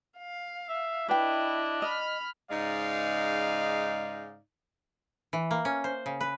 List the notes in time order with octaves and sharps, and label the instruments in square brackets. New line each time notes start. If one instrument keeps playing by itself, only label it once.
[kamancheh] F5
[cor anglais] E5
[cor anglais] D4 [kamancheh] E4 D#5 [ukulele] B4 G5
[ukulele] D#5 [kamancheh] B5 F6
[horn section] G#2 C#3 G#3 D#4 D5 F5
[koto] E3
A#3
C#4
C5
C#3
B4